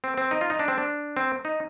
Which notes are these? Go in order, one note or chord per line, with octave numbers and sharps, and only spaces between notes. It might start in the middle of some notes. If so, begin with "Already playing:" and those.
C4
C4
D#4
F4
D#4
D4
C4
D4
C4
D#4